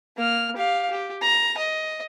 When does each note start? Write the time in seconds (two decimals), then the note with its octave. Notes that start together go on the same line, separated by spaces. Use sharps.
0.17 A#3 F6
0.56 G4 F5
0.90 G4
1.22 A#5
1.58 D#5